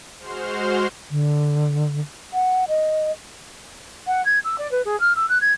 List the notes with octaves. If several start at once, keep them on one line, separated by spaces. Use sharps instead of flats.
G#3 F#4 C5 C6 F6
D3
F#5
D#5
F#5
G#6
E6
D5
B4
G#4
F6
E6
F#6
G#6